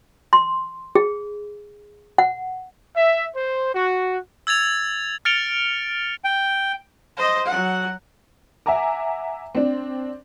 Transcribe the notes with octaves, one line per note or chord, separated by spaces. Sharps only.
C6
G#4
F#5
E5
C5
F#4
E6 G#6 A6 F7
F6 A6 C#7 D7 F7 G7
G5
C5 D#5
F#3 F#5
E5 F#5 G#5 A#5 D6
C4 D4